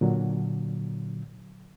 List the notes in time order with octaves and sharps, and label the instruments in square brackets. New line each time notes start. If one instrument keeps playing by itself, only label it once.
[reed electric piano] A#2 D3 F#3